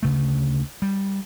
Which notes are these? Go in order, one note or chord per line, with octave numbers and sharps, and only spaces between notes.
D2 C#3 A3
G3